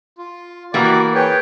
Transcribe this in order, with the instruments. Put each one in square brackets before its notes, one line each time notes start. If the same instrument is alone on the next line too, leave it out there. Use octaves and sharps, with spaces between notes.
[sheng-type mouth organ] F4
[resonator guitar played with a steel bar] E3 A#3 [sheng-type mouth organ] F#4 G4 [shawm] D5
[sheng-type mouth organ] G#4 B4 C#5 [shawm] G5